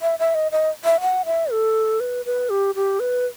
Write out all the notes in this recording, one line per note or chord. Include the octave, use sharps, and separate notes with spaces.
E5
E5
D#5
D#5
E5
F#5
E5
A4
B4
B4
G4
G4
B4